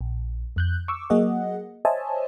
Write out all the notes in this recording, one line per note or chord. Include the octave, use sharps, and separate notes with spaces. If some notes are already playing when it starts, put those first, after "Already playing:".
A#1
F2 F#6 G6
C#6 D6 E6
F#3 A#3 G#4 D#5 F#5
C5 C#5 D#5 E5 G#5 A5